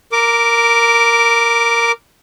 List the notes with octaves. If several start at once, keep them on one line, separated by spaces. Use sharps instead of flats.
A#4 D6